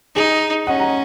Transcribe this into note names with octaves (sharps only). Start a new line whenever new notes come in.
D#4 G#4
C#4 D#5 F#5
F#5 A#5